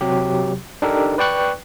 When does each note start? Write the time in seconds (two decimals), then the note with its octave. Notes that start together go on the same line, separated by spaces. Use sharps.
0.01 C3 F#3 G4
0.82 D4 D#4 G4 A4 A#4
1.18 B4 D5 G5 C#6 F#6